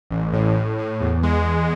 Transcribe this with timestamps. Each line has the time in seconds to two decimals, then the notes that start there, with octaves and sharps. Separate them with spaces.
0.11 A1
0.33 A2
0.55 A2
0.79 A2
1.01 E2
1.23 G#3